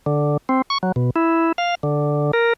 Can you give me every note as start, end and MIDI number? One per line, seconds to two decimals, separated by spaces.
0.06 0.37 50
0.49 0.62 60
0.70 0.78 85
0.83 0.92 54
0.96 1.10 47
1.16 1.52 64
1.58 1.75 77
1.83 2.31 50
2.33 2.53 70